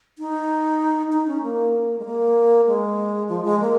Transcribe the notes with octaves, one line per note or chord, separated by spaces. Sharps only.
D#4
D#4
C#4
A#3
G#3
A#3
G#3
F3
G#3
A#3